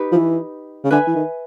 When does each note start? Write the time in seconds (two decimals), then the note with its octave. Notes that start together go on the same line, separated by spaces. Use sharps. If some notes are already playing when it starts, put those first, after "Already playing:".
Already playing: D#4 G4 B4
0.12 F3
0.15 E3
0.84 C#3
0.90 D3 B4 E5 G#5
1.07 E3
1.15 D#3